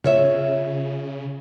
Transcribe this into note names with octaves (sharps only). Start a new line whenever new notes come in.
C#3 F4 C#5 E5